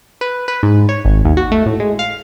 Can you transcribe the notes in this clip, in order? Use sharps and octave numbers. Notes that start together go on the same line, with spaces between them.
B4
B4
G#2
C#5
G#1
D#2
F#4
A3
A2
G#3
F5